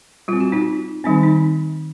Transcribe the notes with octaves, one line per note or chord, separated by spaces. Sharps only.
G3 C4 F4
F#4
D#4 F4
D#3 G3 C4 D#4
D#4